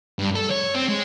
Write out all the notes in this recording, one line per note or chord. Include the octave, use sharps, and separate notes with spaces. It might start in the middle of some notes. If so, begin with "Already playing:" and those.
G2
A4
C#5
C4
G#3